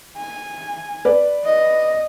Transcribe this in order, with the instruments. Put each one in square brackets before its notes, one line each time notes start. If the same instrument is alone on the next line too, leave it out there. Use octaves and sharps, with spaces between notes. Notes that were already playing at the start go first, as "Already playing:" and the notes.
[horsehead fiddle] G#5
[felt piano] B4 D5
[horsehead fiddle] D#5